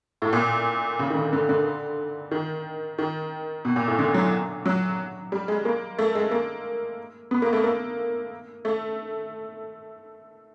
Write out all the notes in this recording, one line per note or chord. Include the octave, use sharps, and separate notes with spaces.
A2
A#2
C#3
D#3
D3
D3
D3
D#3
D#3
B2
A#2
A2
D3
F#3
F#3
G3
G#3
A#3
A3
G#3
A#3
B3
A#3
A3
A#3
A3